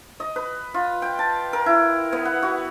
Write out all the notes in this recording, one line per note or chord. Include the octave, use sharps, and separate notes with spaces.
D#5
B4
F4
G5
A5
A#4
E4
B3
F#5
F#4